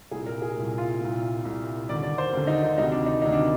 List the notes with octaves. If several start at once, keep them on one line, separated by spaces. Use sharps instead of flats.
C2 A#2 G#4
A#4
G#4
C2 A#2
F4
C2 A#2
C2 A#2
D#2 D3 D5
D5
C5
D#2 D3
D#4
D#4
D2 C3 D#3 D#4
D4
D#4
D2 C3 D#3 D#4
D4